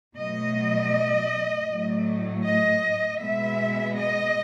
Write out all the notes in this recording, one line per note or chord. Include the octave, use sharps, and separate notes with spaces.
B2 F#3 A3 D#5
A2 F#3 A3
D#5
B2 G#3 B3 E5
D#5